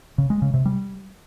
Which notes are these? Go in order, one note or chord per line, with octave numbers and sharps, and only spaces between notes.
C#3
G#3
C#3
C3
G3